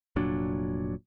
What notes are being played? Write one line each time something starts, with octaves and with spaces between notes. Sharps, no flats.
F1 A#2 F#3 D4